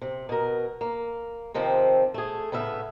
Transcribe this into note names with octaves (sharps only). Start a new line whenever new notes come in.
C3
B2 A#4
A#3
C3 D#3 F3 C4
A3 G#4
A2 C#3 B3 E5